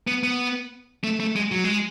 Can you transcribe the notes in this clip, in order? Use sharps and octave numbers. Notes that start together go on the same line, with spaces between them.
B3
B3
A3
A3
G#3
F#3
G#3